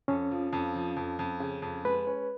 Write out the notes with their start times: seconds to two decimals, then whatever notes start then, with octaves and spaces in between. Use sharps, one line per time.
0.08 F2 C#4
0.31 F3
0.53 F2
0.75 F3
0.96 F2
1.19 F2
1.40 C#3
1.62 F2
1.84 G#3 B4
2.07 C#4